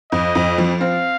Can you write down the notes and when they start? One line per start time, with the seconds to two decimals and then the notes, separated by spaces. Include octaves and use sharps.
0.12 F2 D#5
0.35 F2
0.58 F3
0.81 C4 F5